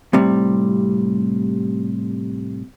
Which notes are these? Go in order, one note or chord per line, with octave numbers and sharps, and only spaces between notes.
A2 C3 G3